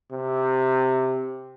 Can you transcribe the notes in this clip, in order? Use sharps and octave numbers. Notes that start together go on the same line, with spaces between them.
C3